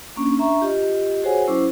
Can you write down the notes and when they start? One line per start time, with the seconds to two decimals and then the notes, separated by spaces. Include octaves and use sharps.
0.16 A#3 C#4 D4
0.39 D4 E5 A#5 C#6
0.60 F4 G4 D#5
1.23 F#4 G#4 C5 C#5 F#5 G#5
1.48 F#3 C#4 E4 C5 D6